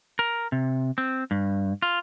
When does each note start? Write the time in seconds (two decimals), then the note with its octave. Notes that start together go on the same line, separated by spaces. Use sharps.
0.19 A#4
0.52 C3
0.98 C4
1.31 G2
1.82 F4